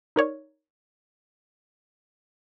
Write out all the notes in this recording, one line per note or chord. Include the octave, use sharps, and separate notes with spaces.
D#4 A#4 C#5 D5